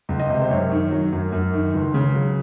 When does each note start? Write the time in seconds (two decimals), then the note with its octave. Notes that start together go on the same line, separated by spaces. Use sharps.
0.09 C#2
0.20 D#5
0.30 C3
0.42 C5
0.50 F#2 C#5
0.71 D#3
0.91 F#3
1.12 F#2
1.32 F#2
1.54 D#3
1.74 C#2
1.94 C#3
2.14 F#3